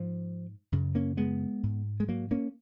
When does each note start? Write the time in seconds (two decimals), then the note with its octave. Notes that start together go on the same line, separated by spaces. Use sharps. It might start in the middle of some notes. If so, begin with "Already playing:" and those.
Already playing: G#2 F3
0.72 F#2 C#3
0.95 A#3 C#4
1.17 G#3 B3
1.63 G#2
2.00 G#3
2.08 F#3 A#3
2.31 A#3 C#4